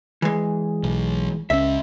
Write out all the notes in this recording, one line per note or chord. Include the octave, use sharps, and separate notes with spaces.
E3 G#3
B1
C#2 C#4 E5